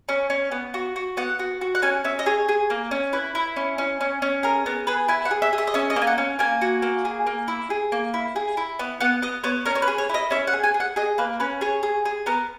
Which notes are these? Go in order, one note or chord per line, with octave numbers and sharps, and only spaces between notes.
C#4
C#4
B3
F#4
F#4
B3 F#5
F#4
F#4
F#5
C#4 G#5
C#4 E5
D#5
G#4 C#5
G#4
A#3
C#4
E4 B4
E4
C#4
C#4
C#4
C#4
G#4 A#4
B3 A#4
G#4 B4
E4 G#5
F#5
G#4
E5
G#4
E5
D#5
C#4 E5
D#5
A#3
G#5
F#5
C#4
A#3 G#5
F#4
A#3
G#4
A#3
E4
G#4
A#3
E4
G#4
E4
B3
B3 F#5
B3 D#5
B3 C#5
C#4 A#4
C#5
B4
G#4
C#5
E4 D#5
C#4 E5
F#5
G#4
G#5
G#4
F#5
G#4 D#5
A#3 B4
C#4 B4
G#4 C#5
G#4
G#4
B3 A#4